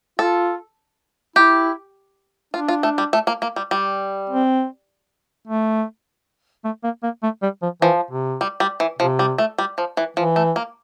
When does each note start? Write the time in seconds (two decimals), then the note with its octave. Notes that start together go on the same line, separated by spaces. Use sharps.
0.19 F4 A4
1.36 E4 G4
2.54 D4 F4
2.68 F4
2.83 A3
2.98 G3
3.13 A3
3.27 A#3
3.42 A#3
3.56 G3
3.71 G3
4.30 C4
5.48 A3
6.65 A3
6.84 A#3
7.03 A#3
7.23 A3
7.42 G3
7.63 F3
7.82 E3 F3
8.11 C3
8.41 G3
8.60 G3
8.80 E3
8.99 C3 F3
9.19 G3
9.38 A3
9.58 G3
9.78 F3
9.97 E3
10.17 E3 F3
10.36 A3
10.56 A#3